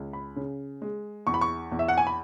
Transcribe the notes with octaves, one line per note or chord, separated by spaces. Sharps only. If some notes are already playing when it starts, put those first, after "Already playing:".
Already playing: C#2
B5
C#3
G#3
E2 C#6
B5
C#6
E2
E5
F#5
G#5
B5